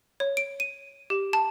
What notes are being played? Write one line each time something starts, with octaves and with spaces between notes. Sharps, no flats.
C#5
D7
D#7
G4
A5